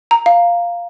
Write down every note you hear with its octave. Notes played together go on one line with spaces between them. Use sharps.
A#5
F5